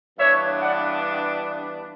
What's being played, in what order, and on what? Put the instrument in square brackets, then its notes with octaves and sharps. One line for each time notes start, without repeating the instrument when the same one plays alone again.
[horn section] G2 E3 B3 D4 C#5 E5
D5 F#5